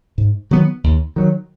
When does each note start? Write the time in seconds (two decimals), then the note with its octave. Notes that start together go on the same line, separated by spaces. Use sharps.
0.18 G#2
0.51 D#3 F#3 B3
0.84 D#2
1.16 D#3 F#3